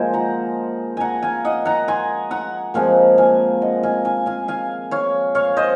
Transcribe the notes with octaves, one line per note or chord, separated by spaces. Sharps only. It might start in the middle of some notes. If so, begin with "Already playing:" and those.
Already playing: A#2 F3 G#3 G#4 A#4 C5 D#5 G#5
F#5 A#5
F#5 G#5 A#5
F5 G#5
D#5 F#5
F#5 A#5
G#5 C6
F#5 A#5
A#2 F3 G#3 C4 F5 G#5
F5 G#5
D#5 F#5
F5 G#5
F5 G#5
F5 G#5
F5 G#5
C#5 F5
C#5 F5
C5 D#5